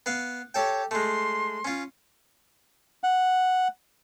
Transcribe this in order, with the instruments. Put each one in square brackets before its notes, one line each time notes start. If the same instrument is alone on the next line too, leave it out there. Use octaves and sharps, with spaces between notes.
[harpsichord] B3 F5
[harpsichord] G4 A4 G5 [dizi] C#5
[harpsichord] G#3 A3 [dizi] C6
[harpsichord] C#4 F4
[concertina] F#5